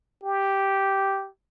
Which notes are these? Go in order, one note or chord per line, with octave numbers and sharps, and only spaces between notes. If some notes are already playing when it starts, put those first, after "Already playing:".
G4